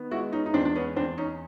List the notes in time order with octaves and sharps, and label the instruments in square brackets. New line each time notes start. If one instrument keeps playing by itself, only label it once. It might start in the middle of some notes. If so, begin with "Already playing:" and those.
Already playing: [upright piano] D#3 B3
[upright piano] G#3 [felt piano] E4 F#4
[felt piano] C#4 D#4
D#4
[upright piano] E2 [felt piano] C4 D4
[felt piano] D4
B3 C#4
[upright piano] E2 [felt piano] C4 D4
[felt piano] C#4 D#4